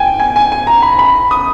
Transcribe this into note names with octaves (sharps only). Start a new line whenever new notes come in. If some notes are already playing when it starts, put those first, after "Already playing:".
Already playing: G5 G#5
G#5
G#5
G#5
A#5
B5
B5
D#6